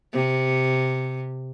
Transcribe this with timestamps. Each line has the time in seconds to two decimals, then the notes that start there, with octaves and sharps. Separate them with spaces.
0.13 C3